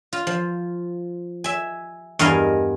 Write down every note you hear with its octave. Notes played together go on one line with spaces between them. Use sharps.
F4
F3
E5 G#5
E2 G2 A#4 D#5 F5 G#5